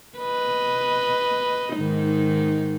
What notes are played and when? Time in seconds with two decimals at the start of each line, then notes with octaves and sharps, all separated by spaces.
0.19 B4 D#5
1.75 G#2 D#3 D#4